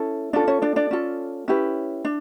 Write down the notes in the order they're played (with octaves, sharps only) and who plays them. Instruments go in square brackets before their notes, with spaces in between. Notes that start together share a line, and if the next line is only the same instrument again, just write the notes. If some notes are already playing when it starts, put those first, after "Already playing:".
Already playing: [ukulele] C#4 E4 A4
C#4 D4 F4 A4 D5
C#4 C#5
D4 D5
D4 D5
C#4 F4 A4
C#4 E4 G4 B4
D4